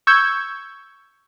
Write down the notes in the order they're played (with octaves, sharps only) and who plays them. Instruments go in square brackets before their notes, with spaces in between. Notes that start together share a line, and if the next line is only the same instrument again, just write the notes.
[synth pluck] C#6 E6 G6 G#6